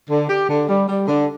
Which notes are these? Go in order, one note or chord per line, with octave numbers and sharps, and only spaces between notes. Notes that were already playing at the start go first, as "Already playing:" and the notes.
D3
G4
D3
G3
G3
D3